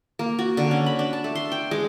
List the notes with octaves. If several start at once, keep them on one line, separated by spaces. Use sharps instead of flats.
A#3
F#4
D3
C#4
B5
D4
A5
A3
C6
G5
G#3